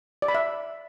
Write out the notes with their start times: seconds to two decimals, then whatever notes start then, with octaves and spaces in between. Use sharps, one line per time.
0.22 D5
0.28 B5
0.35 E5